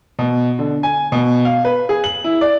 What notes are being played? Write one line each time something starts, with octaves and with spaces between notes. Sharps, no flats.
B2
D3
G#5
B2
F5
B4
G#4
F#7
E4
D5